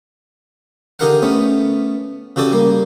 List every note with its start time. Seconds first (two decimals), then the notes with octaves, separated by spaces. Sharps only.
0.99 D3 D#4 G4 A#4 F5 F#5
1.22 A3 B3 C#4
2.36 C#3 F#4 G4 A4 D5 D#6
2.52 G3 A#3